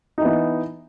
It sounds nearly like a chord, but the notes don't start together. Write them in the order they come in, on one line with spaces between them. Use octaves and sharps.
D#4 E3 B3